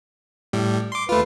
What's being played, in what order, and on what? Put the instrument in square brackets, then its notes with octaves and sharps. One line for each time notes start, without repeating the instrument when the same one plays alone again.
[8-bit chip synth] A2 G3
C6 D6
[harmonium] D#2 B4 [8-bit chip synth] A3 F4